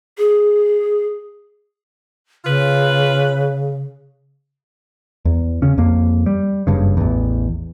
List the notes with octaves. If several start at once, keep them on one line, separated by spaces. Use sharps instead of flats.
G#4
C#3 F4 B4
E2
C#3 C#4
F2 A#3
G3
F#1 G2 C#3
A1 E2